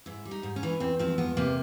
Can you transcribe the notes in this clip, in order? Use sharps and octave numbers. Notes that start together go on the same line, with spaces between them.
G#2 E4
G3
D#4
G#2
C#4
E3
E2 C4
F3 C4
E2 B3
C3 A#3